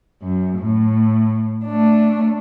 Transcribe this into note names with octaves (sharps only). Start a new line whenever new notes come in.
F#2
A2
A3 D4